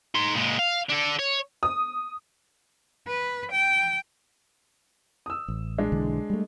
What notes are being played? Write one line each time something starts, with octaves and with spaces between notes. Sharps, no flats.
D#4 C6
A#2 G#3
F5
D4 A4
C#5
D#6
B4
G5
D#6 E6
A1
G#3 D4
B1 D3 E3
G3 A3